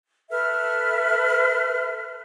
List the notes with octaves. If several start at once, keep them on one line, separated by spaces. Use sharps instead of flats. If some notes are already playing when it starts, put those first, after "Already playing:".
A4 B4 E5 F6